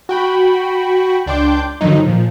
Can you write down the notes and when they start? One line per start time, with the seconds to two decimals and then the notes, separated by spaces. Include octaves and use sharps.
0.09 F#4 G5 B5
1.26 C#2 D4 G5 C6 D6 G6
1.81 G2 D3 D#3 F3 F#3 D#4
2.06 A#2 F3